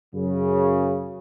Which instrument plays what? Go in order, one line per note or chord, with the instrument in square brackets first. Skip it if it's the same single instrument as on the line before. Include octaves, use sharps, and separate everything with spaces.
[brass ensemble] F#2 C#3